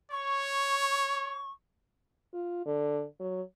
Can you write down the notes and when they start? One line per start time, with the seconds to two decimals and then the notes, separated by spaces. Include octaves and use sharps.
0.12 C#5 C#6
2.33 F4
2.66 D3
3.20 F#3